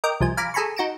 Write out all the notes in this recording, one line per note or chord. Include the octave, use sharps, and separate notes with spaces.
A#4 D#5 G5 D6
C2 F3 G#5
F5 G#5 A#5 B5 D6
G#4 A4 G#5 A#5 B5 C#6
D#4 F#4 A#5 D7 E7